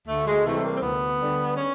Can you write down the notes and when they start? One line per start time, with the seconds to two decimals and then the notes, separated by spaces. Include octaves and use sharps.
0.08 D2 A3
0.26 G#3
0.45 C3 E3 G3 A3
0.64 A#3
0.75 C4
0.82 D2 B3
1.20 D3 G3
1.57 C#4